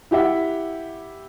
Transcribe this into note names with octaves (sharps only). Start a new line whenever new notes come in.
E4 G4 E5 F#5